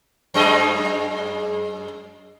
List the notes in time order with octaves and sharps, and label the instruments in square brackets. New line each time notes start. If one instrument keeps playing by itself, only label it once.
[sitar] F#2 G#3 D#5